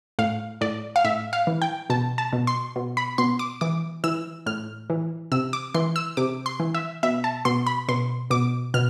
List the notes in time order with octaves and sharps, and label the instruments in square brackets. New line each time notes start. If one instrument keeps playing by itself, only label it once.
[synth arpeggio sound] A2 F5
A2 D5
F5
A2 E5
F5
E3
G5
B2 A5
A5
B2
C6
B2
B5
B2 C6
D6
E3 D6
E3 E6
A2 F6
E3
C3 E6
D6
E3 C6
E6
C3 D6
C6
E3
E5
B2 E5
A5
B2 C6
B5
B2 C6
B2 D6
B2 F6